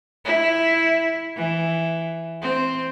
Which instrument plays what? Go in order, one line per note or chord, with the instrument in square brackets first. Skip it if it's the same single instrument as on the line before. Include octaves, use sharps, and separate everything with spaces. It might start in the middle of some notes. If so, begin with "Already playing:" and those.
[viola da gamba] E4
E3
C4